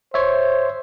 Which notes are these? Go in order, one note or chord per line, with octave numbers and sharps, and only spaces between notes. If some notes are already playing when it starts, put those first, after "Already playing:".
C5 C#5 E5